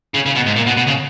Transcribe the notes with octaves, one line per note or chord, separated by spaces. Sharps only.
C#3
C#3
B2
G#2
A#2
B2
B2
C#3